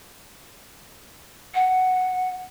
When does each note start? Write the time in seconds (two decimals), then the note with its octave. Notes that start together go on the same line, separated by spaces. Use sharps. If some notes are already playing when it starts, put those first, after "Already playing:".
1.55 F#5